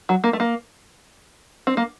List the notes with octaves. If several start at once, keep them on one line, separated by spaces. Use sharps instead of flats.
F#3
A#3
A3
A#3
C4
A#3